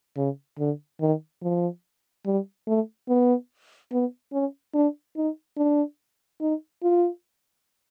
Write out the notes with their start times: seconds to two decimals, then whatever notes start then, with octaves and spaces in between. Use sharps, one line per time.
0.16 C#3
0.58 D3
1.00 D#3
1.42 F3
2.25 G3
2.67 A3
3.09 B3
3.92 B3
4.33 C#4
4.74 D4
5.16 D#4
5.57 D4
6.41 D#4
6.83 F4